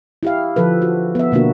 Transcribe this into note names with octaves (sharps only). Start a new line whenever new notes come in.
E4 G4 F5
D3 F3 A4 B4
F#4
B3 E5
B2 D3 A#3 B3 D4 F#4